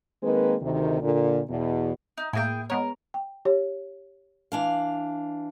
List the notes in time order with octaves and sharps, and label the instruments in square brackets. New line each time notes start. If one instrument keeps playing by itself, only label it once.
[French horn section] D#3 G#3 A#3 C4 B4
D2 C3 D#3
A#2 D3
E2 B2
[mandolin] D#4
[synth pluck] A2 A#3 [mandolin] E4 G#4 G5
[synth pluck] G#3 B3 C#5 [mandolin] A#4
[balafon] G5
G4 C#5
[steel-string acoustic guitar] E3 D4 F5